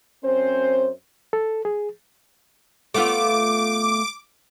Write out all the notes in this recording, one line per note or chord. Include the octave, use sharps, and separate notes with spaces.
F#2 C4 C#4 C5
A4
G#4
A3 B3 F4 D6